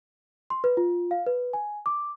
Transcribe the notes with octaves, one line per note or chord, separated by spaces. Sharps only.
C6
B4
F4
F5
B4
G#5
D6